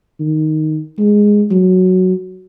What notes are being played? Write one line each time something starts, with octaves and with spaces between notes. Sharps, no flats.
D#3
G#3
F#3